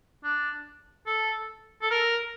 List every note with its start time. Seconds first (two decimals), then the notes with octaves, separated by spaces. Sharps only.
0.24 D4
1.06 A4
1.82 A4
1.91 A#4